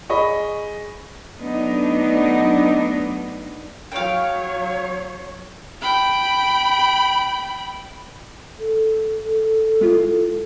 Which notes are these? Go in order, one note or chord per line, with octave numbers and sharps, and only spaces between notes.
G#4 D#5 B5 C#6
F#3 A3 B3 D4 D#4
F#3 C#5 F5 G5
G5 B5
A4
G#3 E4 F4